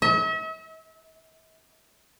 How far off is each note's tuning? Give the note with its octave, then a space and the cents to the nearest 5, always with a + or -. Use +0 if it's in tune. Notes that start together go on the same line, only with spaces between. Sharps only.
E5 -45